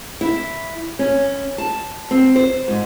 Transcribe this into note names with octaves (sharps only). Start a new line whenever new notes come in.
E4
C#4
A5
C4
C5
G#2